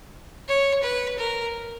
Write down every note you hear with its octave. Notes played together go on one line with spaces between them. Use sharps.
C#5
B4
A#4